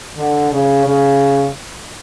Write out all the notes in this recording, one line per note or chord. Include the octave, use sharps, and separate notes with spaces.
D3
C#3
C#3